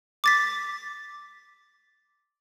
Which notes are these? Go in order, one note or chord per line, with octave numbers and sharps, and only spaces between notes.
D6 A6 B6